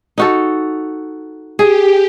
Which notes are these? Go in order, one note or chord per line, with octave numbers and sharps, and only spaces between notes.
D#4 F#4 A4
G4 G#4